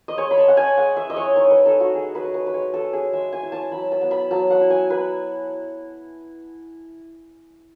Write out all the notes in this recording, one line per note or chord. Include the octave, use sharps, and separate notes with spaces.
D#5
G#3 C#5
B5
A5
C#4 F#5
G#5
G#3 F#5
E5
E4 D#5
C#5
D#4 C#5
B4
D#4 A4
F#4
A3 G#4
B4
A3
B4
B4
G#3 C#5
A4
C#4
G#4
G#3 E5
G#5
E4
A5
F#3 B5
A5
B3
B5
F#3 A5
F#5
E4
G#5
E4 B4